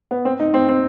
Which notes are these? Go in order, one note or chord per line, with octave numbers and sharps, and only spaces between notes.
B3
C4
D#4
C4
C4